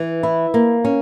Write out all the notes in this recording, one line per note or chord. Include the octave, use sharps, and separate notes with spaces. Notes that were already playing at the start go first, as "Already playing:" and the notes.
Already playing: E3
E4
A#3
C#4